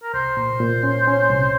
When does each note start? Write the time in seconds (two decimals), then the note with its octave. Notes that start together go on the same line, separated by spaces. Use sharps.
0.03 A#4
0.14 C2 C5
0.37 A#2
0.60 A#2
0.83 C#4
1.07 C#4
1.30 C2